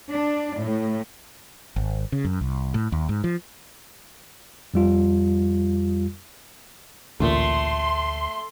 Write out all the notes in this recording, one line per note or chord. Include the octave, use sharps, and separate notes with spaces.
D4
A2
G#1
C#3
F#2
C2
A2
D#2
G#2
F3
F2 G3 F4
A1 D2 A#2 A3 C6